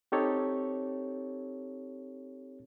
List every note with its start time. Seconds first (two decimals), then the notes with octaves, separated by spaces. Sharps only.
0.12 C4 D#4 G4 A4 C#5